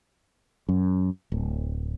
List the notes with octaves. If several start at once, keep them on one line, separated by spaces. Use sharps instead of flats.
F#2
D1